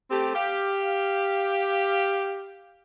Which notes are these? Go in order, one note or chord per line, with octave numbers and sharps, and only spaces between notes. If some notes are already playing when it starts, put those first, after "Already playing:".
A3 C4 G4
G4 F5